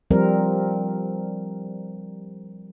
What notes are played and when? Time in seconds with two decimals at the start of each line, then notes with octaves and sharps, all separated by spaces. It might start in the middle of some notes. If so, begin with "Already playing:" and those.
0.11 F3 G3 C4 A#4